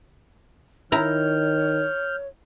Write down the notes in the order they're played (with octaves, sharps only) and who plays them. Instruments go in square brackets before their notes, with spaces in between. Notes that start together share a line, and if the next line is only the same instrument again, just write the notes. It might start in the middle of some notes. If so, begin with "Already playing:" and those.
[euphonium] D#3 [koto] E4 A#5 [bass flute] C#5 [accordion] F6 G6